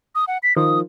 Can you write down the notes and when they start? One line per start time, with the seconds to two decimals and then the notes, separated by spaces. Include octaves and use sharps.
0.15 D#6
0.28 F#5
0.43 B6
0.56 D#3 F3 D#6